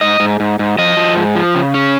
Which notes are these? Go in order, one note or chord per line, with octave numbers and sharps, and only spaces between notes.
G#2 D#5
G#2
G#2
G#2
F3 D#5
F3
G#2
F3
C#3
C#4